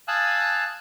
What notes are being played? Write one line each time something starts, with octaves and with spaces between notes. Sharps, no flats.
F5 G#5 A5 D#6 E6 F#6